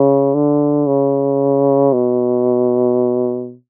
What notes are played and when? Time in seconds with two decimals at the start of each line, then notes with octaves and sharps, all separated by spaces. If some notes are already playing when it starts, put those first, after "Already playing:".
Already playing: C#3
0.34 D3
0.87 C#3
1.93 B2